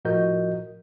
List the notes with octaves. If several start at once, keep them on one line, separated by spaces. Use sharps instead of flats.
A2 F3 F#4 A#4 D#5 G6